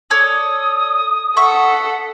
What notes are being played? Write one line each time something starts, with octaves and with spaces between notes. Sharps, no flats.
A4 C#5 D5 D#6
A4 E5 F#5 C#6